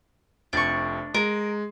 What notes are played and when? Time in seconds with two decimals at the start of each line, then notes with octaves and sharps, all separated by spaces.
0.53 F1 F2 D4 C#6
1.14 G#3 A#4